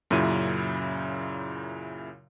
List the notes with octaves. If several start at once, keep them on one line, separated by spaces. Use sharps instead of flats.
F#2 A#2 C#3 E4 D#7